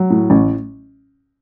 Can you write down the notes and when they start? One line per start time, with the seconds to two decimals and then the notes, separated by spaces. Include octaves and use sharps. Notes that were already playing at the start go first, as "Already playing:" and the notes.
Already playing: F#3
0.10 A2
0.30 A1